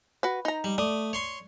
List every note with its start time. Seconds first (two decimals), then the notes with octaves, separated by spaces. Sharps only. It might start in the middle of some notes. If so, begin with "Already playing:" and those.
0.23 F#4 B4
0.45 D#4 A#5
0.64 G3
0.78 A3 D5 D#6
1.13 C#5 C6 C#6